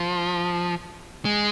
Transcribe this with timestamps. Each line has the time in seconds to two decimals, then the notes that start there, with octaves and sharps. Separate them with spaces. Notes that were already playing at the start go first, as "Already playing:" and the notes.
Already playing: F3
1.25 G#3